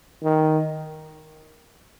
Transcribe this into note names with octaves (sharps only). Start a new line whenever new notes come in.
D#3